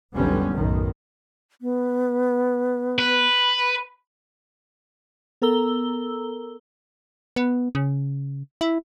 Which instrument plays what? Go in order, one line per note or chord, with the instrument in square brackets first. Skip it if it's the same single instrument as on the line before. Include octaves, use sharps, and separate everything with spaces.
[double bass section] F1 B1 D3 G3 B3 C#4
B1 F#2 A2 D#3
[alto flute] B3
[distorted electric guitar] B4
[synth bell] B3 A4 A#4 A#5 E6 G7
[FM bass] B3
C#3
E4